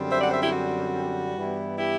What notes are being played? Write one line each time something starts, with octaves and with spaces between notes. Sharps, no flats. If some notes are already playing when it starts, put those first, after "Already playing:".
Already playing: F#2 D3 G3 C4
C5 E5
D5 F#5
C5 E5
E4 G4
F#4
G2 E3 G3 B3 E4
E4 G4